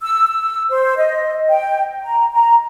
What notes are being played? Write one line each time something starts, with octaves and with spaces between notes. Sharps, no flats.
E6
E6
C5
D#5
G5
A#5
A#5